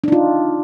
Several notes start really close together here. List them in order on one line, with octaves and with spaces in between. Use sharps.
D4 D#4 F4